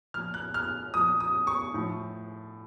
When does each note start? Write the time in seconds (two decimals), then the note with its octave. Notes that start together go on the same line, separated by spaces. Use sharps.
0.14 A#2 F3 F6
0.34 F#6
0.54 F6
0.93 F3 D#6
0.98 A#2
1.20 D#6
1.47 C#6
1.74 A2 F3